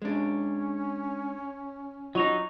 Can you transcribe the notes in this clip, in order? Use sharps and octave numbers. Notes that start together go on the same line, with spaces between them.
G#3 C#4 D4
F#3 D#4 F4 D#5 C#6 F7